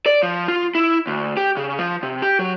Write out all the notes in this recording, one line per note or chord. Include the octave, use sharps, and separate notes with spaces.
D5
F3
F4
E4
D2
G4
C#3
F3
C3
G4
F#3